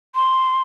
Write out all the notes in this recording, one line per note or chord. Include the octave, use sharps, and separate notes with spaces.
C6